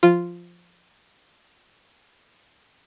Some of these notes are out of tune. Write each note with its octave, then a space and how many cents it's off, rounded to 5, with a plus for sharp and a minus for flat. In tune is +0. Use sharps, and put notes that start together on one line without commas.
F3 +0 F4 -5